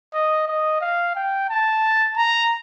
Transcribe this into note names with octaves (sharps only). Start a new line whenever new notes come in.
D#5
D#5
F5
G5
A5
A#5